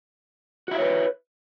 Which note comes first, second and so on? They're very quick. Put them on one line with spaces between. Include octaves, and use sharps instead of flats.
F#4 E4 E5 C#5 B4